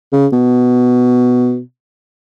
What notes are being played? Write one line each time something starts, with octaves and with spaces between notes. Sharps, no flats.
C#3
B2